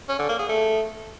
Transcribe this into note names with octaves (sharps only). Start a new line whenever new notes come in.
C#4
D3
A#3
G#4
A3